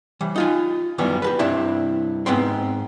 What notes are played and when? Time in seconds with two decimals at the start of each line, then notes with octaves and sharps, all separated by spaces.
0.21 E3 G3
0.36 D#4 F4 G#5
0.98 F#2 D#3 E3 G3 B3
1.22 G4 A4 B4
1.39 G2 C3 D4 E4
2.26 G#2 B3 C4 G5 C6